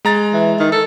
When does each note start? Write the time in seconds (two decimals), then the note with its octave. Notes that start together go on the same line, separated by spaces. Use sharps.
0.05 G#3 A#5 A6
0.33 E3
0.59 D#3
0.72 A4